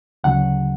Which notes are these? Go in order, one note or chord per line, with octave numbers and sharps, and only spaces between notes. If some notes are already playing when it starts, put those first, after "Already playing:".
D2 C#3 F#3 F#5